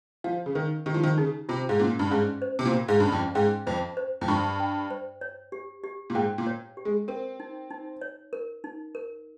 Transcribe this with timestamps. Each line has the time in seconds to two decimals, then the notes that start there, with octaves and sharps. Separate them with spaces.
0.24 F3 F5
0.46 C#3
0.55 D#3 A#4
0.86 D#3 G4
0.94 F3
1.04 D#3
1.18 C#3 D#4
1.49 C3 F4
1.69 G#2
1.80 A#2 C#4
1.99 G2
2.10 G#2 C#4
2.42 C5
2.59 C3
2.65 A#2
2.73 F4
2.88 G#2
3.00 G2 C#4
3.12 F2
3.35 G#2 G5
3.67 F2 C5
3.97 C5
4.21 F2
4.28 G2 C#6
4.60 G5
4.91 C5
5.21 C#5
5.52 G4
5.84 G4
6.10 A#2
6.15 G#2 G5
6.38 A#2
6.47 C#5
6.77 G4
6.85 G#3
7.08 C4 A#4
7.40 D#4
7.71 D#4
8.01 C#5
8.33 A#4
8.64 D#4
8.95 A#4